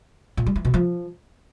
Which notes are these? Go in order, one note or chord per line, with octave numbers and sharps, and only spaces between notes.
A#2
G3
E3
B2
F3